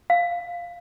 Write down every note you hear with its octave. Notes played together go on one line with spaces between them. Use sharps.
F5